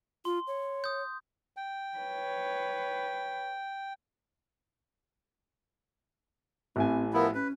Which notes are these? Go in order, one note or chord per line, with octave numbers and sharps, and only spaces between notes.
F4 C6
C#5
D#6 G6
G5
B4 C#5
A1 E3 C4 G#5
F3 B3 E4 A#4
C#4 B4